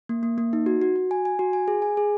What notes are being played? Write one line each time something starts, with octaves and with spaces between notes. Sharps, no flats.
A#3
A#3
A#3
D#4
F#4
F#4
F#4
G#5
G#5
F#4
G#5
G#4
G#5
G#4